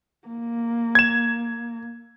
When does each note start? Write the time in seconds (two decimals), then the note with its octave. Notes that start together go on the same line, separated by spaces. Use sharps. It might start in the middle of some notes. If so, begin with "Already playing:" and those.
0.28 A#3
0.95 G#6 E7